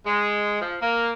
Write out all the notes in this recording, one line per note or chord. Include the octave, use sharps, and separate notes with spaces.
G#3
F3
A#3